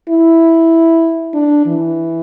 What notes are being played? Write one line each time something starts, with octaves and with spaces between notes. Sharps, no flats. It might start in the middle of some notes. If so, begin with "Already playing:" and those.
E4
D4
E3